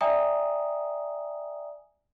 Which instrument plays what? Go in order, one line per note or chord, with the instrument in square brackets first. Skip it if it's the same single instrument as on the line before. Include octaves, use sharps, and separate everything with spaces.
[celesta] D5 E5 G5 G#5 A#5 D#6